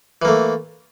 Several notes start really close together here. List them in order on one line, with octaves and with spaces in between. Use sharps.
E3 A#3 A3